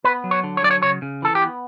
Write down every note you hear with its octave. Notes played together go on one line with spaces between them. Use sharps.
B3 B4
F#3
C#5
D3
C#5
F#3 D5
C#5
C#3 C#5
C#3
E3 A4
G4
B3